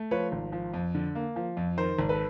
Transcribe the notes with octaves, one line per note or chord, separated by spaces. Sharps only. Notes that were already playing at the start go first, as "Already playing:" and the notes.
Already playing: A3
F3 B4 C#5
G#1
F3
F2
D3
A#3
F3
F2
D#3 A#4 C5
G#1
A4 B4